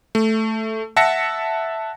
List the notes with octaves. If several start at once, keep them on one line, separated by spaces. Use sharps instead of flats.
A3
E5 F#5 A5 A#6 C#7